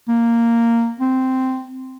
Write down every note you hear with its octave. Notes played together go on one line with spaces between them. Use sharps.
A#3
C4